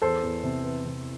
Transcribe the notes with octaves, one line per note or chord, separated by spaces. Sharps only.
E2 A4 C5
E2
C3
E3
C3